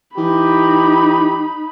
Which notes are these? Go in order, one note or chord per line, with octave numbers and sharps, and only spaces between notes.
E3 D#4 G4 B5